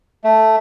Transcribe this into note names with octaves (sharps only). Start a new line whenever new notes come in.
A3